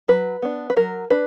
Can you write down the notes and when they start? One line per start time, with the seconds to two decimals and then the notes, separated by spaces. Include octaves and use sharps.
0.08 F#3 B4
0.42 B3 D4
0.70 B4
0.76 F#3 A#4
1.10 D4 B4